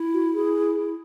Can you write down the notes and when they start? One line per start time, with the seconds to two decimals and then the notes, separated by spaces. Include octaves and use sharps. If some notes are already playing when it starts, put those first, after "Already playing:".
Already playing: E4
0.14 F#4
0.34 G#4